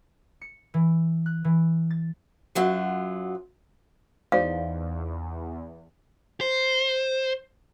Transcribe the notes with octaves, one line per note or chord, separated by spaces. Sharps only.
C#7
E3
F#6
E3
A6
F#2 F#3 F4
E2 D#4 C5 D5 F5
C5